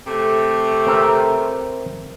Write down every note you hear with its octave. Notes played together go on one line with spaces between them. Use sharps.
C3 A3
C4 A#4 E5